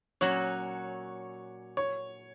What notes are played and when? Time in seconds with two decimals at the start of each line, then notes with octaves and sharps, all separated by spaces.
0.21 A#2 F#3 C#4 F#4 C#5
1.77 C#5